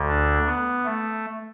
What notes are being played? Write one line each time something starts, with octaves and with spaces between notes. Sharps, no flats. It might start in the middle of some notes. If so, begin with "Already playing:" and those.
Already playing: D2 D3
D4
B3
A3